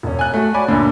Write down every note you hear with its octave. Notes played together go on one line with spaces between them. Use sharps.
E1 C#4
G#5 F#6
A3 F#4
C#5 D5 G#5 B5 D6
D2 A#2 D3